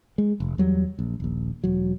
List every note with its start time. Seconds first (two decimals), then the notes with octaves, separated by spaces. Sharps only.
0.18 G#3
0.40 F1
0.58 E2 F#3 G3
0.99 A#1
1.20 D#1 A#1
1.64 E1 F#3